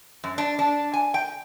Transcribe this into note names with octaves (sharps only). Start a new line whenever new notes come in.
F#2
D4
D4
G#5
G5